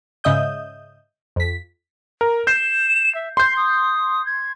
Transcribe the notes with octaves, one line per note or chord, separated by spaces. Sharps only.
G#2 C#3 D#5 E5 D#6 G6
F2 B6
A#4
G6 C7 E7
E5
C6 G6 C7
D#6
G#6